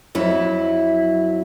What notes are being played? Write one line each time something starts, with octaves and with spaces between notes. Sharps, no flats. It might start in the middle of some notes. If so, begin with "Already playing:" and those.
F2 F#3 E4